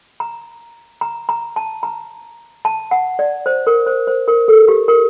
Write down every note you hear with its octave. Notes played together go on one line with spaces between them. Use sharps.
A#5
A#5
A#5
A5
A#5
A5
F#5
D5
C5
A#4
C5
C5
A#4
A4
G4
A#4